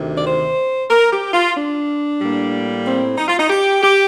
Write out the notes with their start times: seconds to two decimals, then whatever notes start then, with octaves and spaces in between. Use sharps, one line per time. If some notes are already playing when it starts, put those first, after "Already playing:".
Already playing: D2 C3 D#3
0.18 D5
0.26 C5
0.91 A#4
1.12 G4
1.34 F4
1.56 D4
2.21 A2 G3 A#3
2.85 C4
3.18 D#4
3.28 F4
3.39 D#4
3.50 G4
3.83 G4